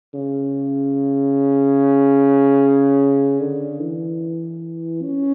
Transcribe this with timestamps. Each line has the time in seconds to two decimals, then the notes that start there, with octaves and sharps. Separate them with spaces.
0.15 C#3
3.40 D3
3.80 E3
5.03 C#4